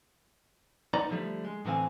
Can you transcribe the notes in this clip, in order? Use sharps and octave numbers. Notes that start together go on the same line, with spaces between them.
B3 D#4 D5 A#5
D3 F3 G3 A3
G#3
A2 D3 E3 C4 F5 G#5